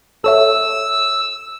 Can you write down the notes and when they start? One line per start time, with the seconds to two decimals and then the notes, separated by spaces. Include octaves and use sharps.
0.24 A4 C#5 E5 E6